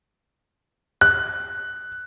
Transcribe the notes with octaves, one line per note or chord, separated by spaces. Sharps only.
F#6